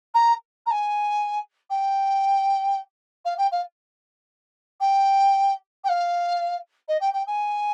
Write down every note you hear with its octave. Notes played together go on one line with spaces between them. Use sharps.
A#5
A#5
G#5
G5
F5
G5
F5
G5
G5
F5
D#5
G5
G5
G#5